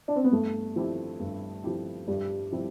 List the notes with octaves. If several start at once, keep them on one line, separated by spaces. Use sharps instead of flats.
D4
C4
B3
G2 A3
F3 C4 E4 G4
G2
F3 C4 E4 G4
G2 G3
F3 C4 E4 G4